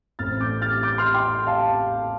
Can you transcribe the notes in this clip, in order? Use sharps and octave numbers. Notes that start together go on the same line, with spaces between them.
A1 A2 A3 C4 F6 A6
D6 G6
F6 A6
D6 G6
C6 F6
G5 C6
F5 A5